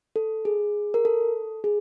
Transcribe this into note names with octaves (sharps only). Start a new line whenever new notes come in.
A4
G#4
A#4
A4
G#4